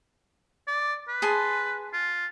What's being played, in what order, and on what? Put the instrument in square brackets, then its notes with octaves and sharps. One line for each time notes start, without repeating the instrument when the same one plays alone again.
[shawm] D5
B4
[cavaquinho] G#4 A5 C6
[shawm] F4